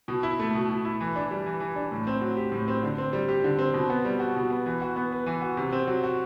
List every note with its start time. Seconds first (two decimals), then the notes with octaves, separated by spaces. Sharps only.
0.08 B2
0.23 E4
0.39 A3
0.55 B2
0.70 B2
0.85 E4
1.01 E3
1.16 D4
1.31 G3
1.46 E3
1.60 E3
1.76 D4
1.92 A2
2.07 C4
2.21 F#3
2.37 G4
2.52 A2
2.68 C4
2.83 D3
2.98 C4
3.13 G3
3.29 G4
3.44 D3
3.59 C4
3.74 B2
3.90 B3
4.05 G3
4.20 F#4
4.36 B2
4.50 B3
4.66 E3
4.82 F#4
4.96 B3
5.12 B4
5.26 E3
5.42 F#4
5.57 C3
5.72 C4
5.87 F#3
6.03 F#4